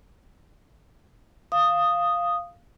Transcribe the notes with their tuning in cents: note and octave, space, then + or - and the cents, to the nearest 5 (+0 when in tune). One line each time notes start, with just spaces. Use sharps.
F5 -5 D#6 +0